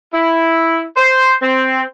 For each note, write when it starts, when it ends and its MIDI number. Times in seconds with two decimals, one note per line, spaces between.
0.13 0.83 64
0.96 1.35 72
1.42 1.82 60